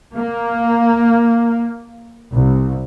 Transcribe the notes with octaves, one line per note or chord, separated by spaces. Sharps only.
A#3
C2